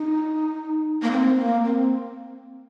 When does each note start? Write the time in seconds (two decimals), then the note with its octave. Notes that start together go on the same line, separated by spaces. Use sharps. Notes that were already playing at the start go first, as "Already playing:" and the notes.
Already playing: D#4
1.02 A#3
1.11 C4
1.38 A#3
1.65 C4